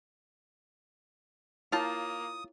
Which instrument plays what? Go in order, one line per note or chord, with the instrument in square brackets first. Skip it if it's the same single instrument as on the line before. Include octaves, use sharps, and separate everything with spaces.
[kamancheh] A#3 [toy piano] E4 C#5 G5 [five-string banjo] F4 A5 [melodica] D#6